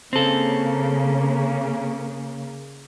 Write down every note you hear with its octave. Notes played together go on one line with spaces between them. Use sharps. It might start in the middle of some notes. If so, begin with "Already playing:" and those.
C#3 A#3 C4 A4